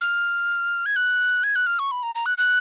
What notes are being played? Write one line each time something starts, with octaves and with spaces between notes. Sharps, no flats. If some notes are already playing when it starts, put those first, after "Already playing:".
F6
G#6
F#6
G#6
F#6
F6
C#6
B5
A#5
A#5
F#6
F#6